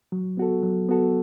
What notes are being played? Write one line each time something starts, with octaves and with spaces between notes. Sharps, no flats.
F#3
B3 F#4 A4
F#3
B3 F#4 A4